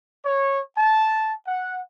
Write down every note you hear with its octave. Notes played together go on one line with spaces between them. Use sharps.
C#5
A5
F#5